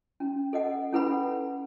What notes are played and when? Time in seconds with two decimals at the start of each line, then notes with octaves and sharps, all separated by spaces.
0.20 C#4
0.53 A4 D#5 F#5
0.92 C#4 E4 A4 B4 F#5 B5